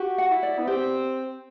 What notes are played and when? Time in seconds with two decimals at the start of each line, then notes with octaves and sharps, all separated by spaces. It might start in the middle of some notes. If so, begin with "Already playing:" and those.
Already playing: F#4 G4
0.18 F#5
0.30 E4
0.43 D5
0.59 B3
0.67 C4 G4